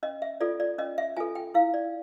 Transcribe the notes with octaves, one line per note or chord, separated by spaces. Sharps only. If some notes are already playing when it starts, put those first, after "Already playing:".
C#4 D#5
E5
F4 A4 D5
D5
C#4 D#5
E5
F4 A4 G#5
G5
E4 F5
D5